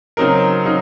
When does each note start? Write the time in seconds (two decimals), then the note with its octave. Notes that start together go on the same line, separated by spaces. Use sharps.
0.17 C#3 F#3 C4 D#4 A#4
0.65 C#3 F#3 D#4